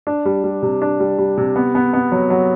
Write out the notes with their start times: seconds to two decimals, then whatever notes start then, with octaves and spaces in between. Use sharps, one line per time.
0.07 D4
0.25 G3
0.44 G3
0.62 C3
0.82 D4
1.00 G3
1.18 G3
1.38 C3
1.56 B3
1.75 B3
1.93 B3
2.12 F#3
2.30 F#3